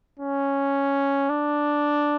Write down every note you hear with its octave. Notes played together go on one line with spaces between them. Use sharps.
C#4
D4